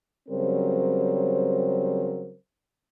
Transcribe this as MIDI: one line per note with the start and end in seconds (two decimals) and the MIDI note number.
0.29 2.34 49
0.29 2.34 54
0.29 2.34 55
0.29 2.34 60
0.29 2.34 70
0.29 2.34 72